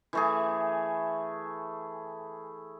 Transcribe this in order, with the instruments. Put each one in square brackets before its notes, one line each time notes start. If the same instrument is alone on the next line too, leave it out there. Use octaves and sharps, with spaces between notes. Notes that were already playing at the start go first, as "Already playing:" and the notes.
[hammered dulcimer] E3 A3 G#4